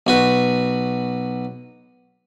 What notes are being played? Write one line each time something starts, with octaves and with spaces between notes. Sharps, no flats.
B1 F#4 B4